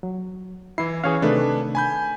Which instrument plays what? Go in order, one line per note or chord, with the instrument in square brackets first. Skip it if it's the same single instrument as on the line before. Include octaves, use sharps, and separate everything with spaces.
[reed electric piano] F#3
[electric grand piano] E3 C7 [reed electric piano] E4
[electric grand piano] E3 C#4 [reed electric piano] G#4 C#5 F5
[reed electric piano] C3 D#3 A3 [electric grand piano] D4 A4 B4
[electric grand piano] G#5 B5 G6